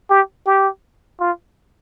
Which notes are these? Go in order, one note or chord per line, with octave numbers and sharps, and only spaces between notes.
G4
G4
F4